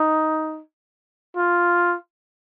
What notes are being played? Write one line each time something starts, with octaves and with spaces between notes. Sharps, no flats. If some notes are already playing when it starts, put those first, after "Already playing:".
Already playing: D#4
F4